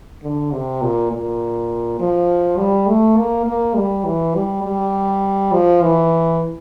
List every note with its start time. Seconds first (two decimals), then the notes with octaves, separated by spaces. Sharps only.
0.22 D3
0.52 C3
0.82 A#2
1.11 A#2
1.99 F3
2.58 G3
2.88 A3
3.17 A#3
3.46 A#3
3.75 G3
4.05 E3
4.35 G3
4.64 G3
5.52 F3
5.82 E3